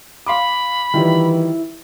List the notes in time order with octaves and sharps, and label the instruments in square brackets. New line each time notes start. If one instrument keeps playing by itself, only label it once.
[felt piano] F5 C6 D6 [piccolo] B5
[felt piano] D#3 G3 F4 [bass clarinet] E3 [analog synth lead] E4